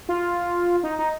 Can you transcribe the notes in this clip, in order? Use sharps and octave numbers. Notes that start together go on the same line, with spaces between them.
F4
D#4
D#4